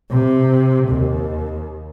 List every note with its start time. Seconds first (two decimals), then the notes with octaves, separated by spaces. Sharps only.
0.11 C3
0.89 D#2